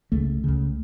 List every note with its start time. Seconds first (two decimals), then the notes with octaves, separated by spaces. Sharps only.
0.12 C#2 C#3 A3
0.44 C#2 C#3